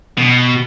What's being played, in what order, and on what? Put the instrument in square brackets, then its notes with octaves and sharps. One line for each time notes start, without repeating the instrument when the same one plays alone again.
[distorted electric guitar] B2